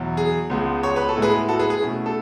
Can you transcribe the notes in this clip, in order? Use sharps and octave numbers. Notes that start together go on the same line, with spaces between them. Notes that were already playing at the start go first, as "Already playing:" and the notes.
Already playing: E2 B2 F#3
G#4
C#2 C#3 G#3 B3
C#5
B4
A4
A2 G#3 B3 E4
G#4 B4
F#4 A4
G#4 B4
G#4
B2 A3 C#4 E4
A4